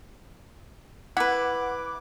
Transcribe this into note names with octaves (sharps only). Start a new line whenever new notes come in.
E4 B4 F#5 D6